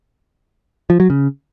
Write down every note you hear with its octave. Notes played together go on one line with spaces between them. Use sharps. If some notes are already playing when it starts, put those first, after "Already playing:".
F3
F#3
C#3